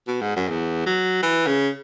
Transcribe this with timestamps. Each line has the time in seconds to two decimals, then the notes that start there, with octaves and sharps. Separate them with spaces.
0.08 B2
0.21 G#2
0.36 F#2
0.49 E2
0.86 F#3
1.23 E3
1.47 C#3